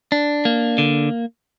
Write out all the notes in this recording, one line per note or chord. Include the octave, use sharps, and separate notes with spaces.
D4
A#3
D3